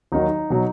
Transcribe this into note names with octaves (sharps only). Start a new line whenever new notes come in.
D#2 D#3 F#3 D#4
B2 F#3